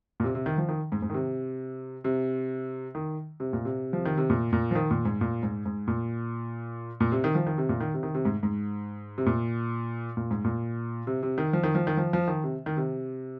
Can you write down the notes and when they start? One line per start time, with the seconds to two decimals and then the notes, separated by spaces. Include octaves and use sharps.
0.20 A#2
0.24 C3
0.35 C3
0.46 D#3
0.58 F3
0.69 D#3
0.92 G#2
1.02 G#2
1.10 D#3
1.14 C3
2.04 C3
2.95 D#3
3.40 C3
3.53 A#2
3.65 C3
3.93 F3
4.05 D#3
4.18 C3
4.30 A#2
4.53 A#2
4.71 F3
4.75 D#3
4.91 A#2
5.05 G#2
5.21 A#2
5.43 G#2
5.66 G#2
5.88 A#2
7.00 A#2
7.12 C3
7.24 D#3
7.35 F3
7.46 D#3
7.58 C3
7.69 A#2
7.80 D#3
7.94 C3
8.03 D#3
8.14 C3
8.25 G#2
8.43 G#2
9.18 C3
9.26 A#2
10.17 A#2
10.31 G#2
10.44 A#2
11.07 C3
11.23 C3
11.38 D#3
11.53 F3
11.63 D#3
11.75 F3
11.87 D#3
11.97 F3
12.13 F3
12.28 D#3
12.44 C3
12.66 D#3
12.77 C3